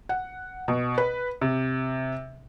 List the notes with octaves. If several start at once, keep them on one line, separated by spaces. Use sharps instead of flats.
F#5
B2
B4
C3